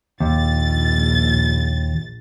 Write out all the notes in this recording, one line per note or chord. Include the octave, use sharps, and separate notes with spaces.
A#1 D#2 A6